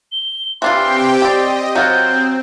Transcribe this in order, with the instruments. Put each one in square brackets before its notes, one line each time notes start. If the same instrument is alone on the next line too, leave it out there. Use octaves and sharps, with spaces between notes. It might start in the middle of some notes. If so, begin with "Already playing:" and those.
[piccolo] G7
[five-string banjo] E3 D4 F4 [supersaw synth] C4 G4 G5 [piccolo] C6
[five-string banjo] G4 D5 [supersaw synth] D#5 [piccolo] C6
[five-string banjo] F#3 F4 F#4 [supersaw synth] C4 [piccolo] G6